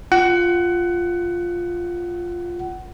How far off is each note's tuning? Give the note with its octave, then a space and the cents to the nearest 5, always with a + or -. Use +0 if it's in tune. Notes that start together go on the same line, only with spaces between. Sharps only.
F4 +0 F#5 +20